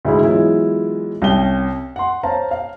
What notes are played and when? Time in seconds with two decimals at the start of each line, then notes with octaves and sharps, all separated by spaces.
0.05 D2 G#2 E4 G#4 B5
0.22 E3 F#3 G#3 B3 E4 F4
1.22 C2 C#4 G5 G7
1.96 F#5 C6
2.23 C5 C#5 F5 A5 A#5
2.51 F5